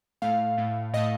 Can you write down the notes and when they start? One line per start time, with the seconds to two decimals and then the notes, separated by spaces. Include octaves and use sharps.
0.22 A2 A3 F5
0.58 A2 A3
0.93 A2 A3 D#5